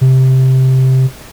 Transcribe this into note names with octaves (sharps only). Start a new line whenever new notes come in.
C3